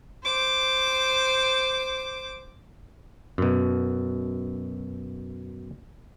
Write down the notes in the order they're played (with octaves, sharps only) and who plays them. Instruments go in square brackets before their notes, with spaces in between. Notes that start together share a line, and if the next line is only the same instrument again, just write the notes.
[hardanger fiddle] C5 D6
[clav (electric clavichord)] F#2 B2